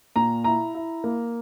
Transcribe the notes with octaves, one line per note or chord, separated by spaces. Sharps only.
A#2 A#5
E4 A#5
E4
A#3